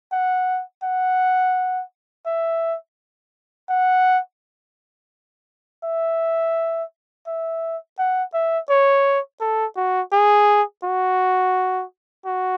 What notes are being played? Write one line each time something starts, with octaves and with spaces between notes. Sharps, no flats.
F#5
F#5
E5
F#5
E5
E5
F#5
E5
C#5
A4
F#4
G#4
F#4
F#4